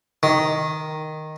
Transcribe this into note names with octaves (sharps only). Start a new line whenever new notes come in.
D#3